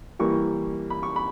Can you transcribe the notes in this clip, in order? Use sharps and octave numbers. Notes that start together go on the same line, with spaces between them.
E3 G3 A#3 C#6
B5
C#6
B5